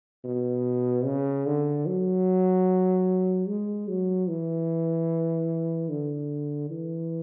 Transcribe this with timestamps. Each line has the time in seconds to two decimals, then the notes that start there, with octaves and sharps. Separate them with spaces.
0.24 B2
1.05 C#3
1.46 D3
1.86 F#3
3.48 G#3
3.88 F#3
4.29 E3
5.89 D3
6.70 E3